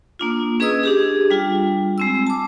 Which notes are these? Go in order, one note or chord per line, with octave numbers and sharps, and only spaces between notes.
A#3 D4 F4
C#4 G#4 B4 D#5 D#6 E6
D4 G4 G#4
G3 D4 F4
G#3 C4 E6
A5 D6